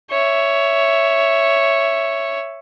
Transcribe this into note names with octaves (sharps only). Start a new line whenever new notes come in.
C#5 E5